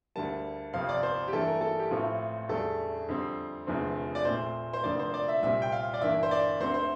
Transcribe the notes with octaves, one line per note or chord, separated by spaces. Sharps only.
D2 D3 G3 A#3 A5
G1 F2 C3 F3 C4 F5
D5
C5
G4
G2 E3 A3 A4
A#4
A4
G4
A1 A2 F3 C4 F4
E2 D3 G3 D4 A4
F2 D3 G3 C4
F1 E2 D3 F3 C4
D5
A#1 A#2 A3 C4 C5
C5
F1 F2 D3 F3 A#3 D5
C5
D5
E5
C2 A#2 G3 C4 E5
G5
F5
D5
G1 G2 E3 A#3 D4 E5
C5
D5
D2 D3 A3 C4 C5
C5